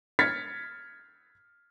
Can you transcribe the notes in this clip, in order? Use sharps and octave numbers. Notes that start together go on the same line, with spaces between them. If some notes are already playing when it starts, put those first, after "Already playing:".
F6 G#6 A6 B6 C#7